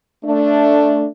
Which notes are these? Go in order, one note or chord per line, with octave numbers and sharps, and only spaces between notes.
A3 D4